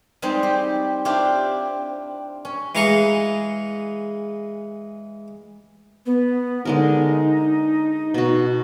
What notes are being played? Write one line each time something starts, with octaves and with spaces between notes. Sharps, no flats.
G3 G#3 C4 D#4
G4
C4 D4 E4 F4 G4
C#4
E3 G#3 F5 G#5 A#5 C#6
B3
D3 G#3 D#4 A#4
B2 F#4